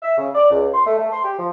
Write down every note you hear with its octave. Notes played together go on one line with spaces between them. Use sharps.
E5
C#3
D5
C#2
C6
A3
A3
C6
G4
F3